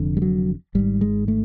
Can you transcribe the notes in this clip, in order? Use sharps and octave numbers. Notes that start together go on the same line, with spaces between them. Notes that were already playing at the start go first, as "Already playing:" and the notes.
Already playing: F1 F2 D3
G3
F#3
G#1 G#2 G3
G#3
A3